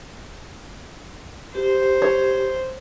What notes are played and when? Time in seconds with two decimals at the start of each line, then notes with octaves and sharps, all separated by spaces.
1.55 G4 C5
2.02 C#5